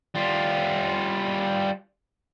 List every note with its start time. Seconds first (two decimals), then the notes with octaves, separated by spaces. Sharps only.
0.15 G3 F4